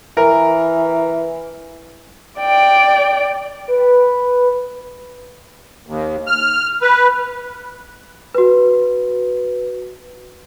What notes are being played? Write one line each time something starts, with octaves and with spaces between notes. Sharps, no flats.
E3 A#4
D5 G5
B4
D#2
F6
B4
F#4 B4